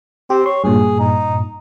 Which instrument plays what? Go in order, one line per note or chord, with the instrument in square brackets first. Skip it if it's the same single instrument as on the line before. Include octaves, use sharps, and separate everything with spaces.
[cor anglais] C4 [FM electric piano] G4
[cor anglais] C#5 [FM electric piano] C6
[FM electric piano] G2 A#2 [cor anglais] G#4
[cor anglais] D#4